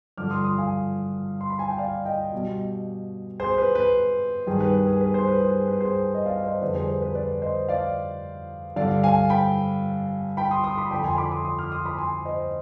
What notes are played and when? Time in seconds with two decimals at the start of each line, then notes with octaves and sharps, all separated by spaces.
0.17 G2 D3 F3 D6 F6
0.31 C6 D#6
0.44 C6 D#6
0.58 F5 G#5
1.41 C6
1.50 B5
1.59 G#5
1.69 G5
1.79 D5 F5
2.05 D#5 G5
2.32 B2 G3
3.40 G#4 C5
3.58 B4
3.75 B4
4.47 G2 D#3 G3 G#4
4.60 B4
4.74 B4
4.87 G#4
5.01 B4
5.14 G#4 C5
5.28 B4
5.41 G#4 C5
5.68 B4
5.81 G#4 C5
6.15 D#5
6.26 D5 F5
6.44 C5 D#5
6.61 F2 D3 G3 B4 D5
6.74 G#4 C5
6.88 B4
7.02 B4
7.15 B4 D5
7.42 C5 D#5
7.69 D5 F5
8.76 G2 D3 G3 D5 F5
9.03 F5 G#5
9.30 G5 B5
10.37 G5 B5
10.51 C6 D#6
10.64 C6 D#6
10.78 B5 D6
10.91 F2 D3 F3 G5 B5
11.04 G#5 C6
11.17 B5 D6
11.31 C6 D#6
11.45 C6 D#6
11.59 D6 F6
11.72 C6 D#6
11.86 B5 D6
11.98 G#5 C6
12.25 C5 D#5